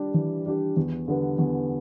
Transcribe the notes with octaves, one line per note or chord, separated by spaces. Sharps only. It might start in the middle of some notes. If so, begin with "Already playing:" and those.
Already playing: G3 D4 G4
E3
G3 D4 G4
E2
D3 G3 B3
E2